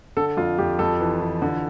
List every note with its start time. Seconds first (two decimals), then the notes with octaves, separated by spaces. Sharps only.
0.17 D3 A4
0.37 F2 F4
0.58 F2 G4
0.79 F2 A4
1.00 E3
1.20 E3
1.42 D3